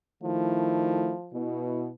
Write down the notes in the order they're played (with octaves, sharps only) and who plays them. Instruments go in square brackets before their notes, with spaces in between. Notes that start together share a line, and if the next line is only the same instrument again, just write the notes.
[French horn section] D#3 A3 E4 [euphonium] F3
[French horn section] B2 E4